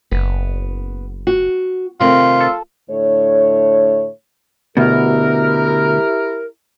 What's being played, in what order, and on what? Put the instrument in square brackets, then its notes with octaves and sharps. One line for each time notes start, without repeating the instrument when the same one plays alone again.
[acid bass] F#1 [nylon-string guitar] B3
[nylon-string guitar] F#4
[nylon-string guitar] C3 D#3 A3 [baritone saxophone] F4
[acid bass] A4
[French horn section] A2 D3 A3 C#5
[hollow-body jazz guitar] D2 B2 [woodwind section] E4 G4 A#4